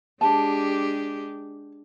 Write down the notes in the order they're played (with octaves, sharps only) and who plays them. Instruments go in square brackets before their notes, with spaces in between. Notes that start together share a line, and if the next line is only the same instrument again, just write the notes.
[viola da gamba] G#3 D4 G4 [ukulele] A5